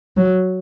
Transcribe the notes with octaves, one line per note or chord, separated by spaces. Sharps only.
F#3